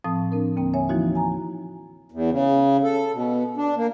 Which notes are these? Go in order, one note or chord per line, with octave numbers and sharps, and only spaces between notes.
A2 F3 C4 A5 D#6
C4 D4 A#4
D#2 D3 A#3 C4 G5
C#5 E5 G#5
E3 F3 A#3 D#4 E4 F#4
G#5 A#5
E2
C#3
A4
B2
D4
A#3